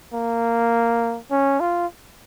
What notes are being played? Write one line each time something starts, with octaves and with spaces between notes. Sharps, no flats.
A#3
C#4
F4